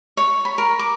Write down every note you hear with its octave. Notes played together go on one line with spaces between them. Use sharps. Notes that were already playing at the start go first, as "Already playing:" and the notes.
C#5
B5
A#4
D6